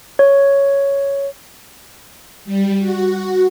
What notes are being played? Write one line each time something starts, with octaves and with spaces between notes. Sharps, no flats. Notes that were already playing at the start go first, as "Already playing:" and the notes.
C#5
G3
F#4